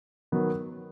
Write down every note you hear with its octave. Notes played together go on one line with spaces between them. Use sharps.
D#3 F#3 B3